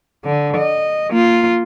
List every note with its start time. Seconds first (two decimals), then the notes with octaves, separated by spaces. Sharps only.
0.25 D3
0.57 D#5
1.10 A#3 F4